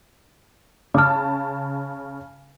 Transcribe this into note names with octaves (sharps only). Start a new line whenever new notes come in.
C#3 A5 D6 D#6 F6